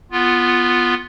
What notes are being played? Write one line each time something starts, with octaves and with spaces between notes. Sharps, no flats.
B3 F4